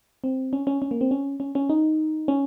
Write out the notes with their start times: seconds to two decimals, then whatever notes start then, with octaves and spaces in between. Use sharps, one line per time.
0.24 C4
0.53 C#4
0.67 C#4
0.82 C#4
0.91 A#3
1.01 C4
1.11 C#4
1.40 C#4
1.55 C#4
1.69 D#4
2.28 C#4